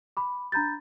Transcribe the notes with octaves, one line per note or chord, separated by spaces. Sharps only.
B5 D6
D4 A#5 B5 G6 A6